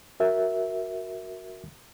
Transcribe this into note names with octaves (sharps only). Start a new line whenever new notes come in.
F#4 A#4 E5